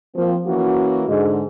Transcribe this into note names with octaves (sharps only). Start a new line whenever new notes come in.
F3 A#3 C4
E3 A#3 C#4 F#4
G#2 D3 G#3